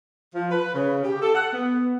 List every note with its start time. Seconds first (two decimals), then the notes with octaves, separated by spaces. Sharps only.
0.34 F3
0.51 B4
0.74 C#3
1.04 G4
1.21 A4
1.35 F#5
1.53 B3